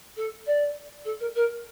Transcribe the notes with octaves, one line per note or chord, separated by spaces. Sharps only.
A4
D5
A4
A#4
A#4